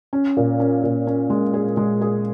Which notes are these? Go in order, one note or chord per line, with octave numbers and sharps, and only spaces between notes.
C#4
A#2
C#4
A#2
C#4
G#3
G#4
G#3
G#4